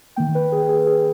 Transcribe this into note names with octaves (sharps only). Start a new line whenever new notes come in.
D#3 A#3 G5
B4
G#4
G#4
G#4